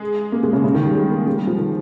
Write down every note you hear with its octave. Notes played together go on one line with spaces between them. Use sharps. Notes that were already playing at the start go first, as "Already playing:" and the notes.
Already playing: G#3
A#3
G#3
C#3
C#3
D#3
G3
G#3
A#3
G#3
G3
F3
D#3